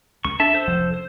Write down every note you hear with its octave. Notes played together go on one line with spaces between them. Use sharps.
C#2 C#6
D4 A4 E5 A5
A4 C5
F1 C#2 F3
C5